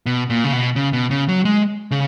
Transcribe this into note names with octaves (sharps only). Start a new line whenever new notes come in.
B2
A#2
C#3
B2
C#3
B2
C#3
F#3
G#3
C#3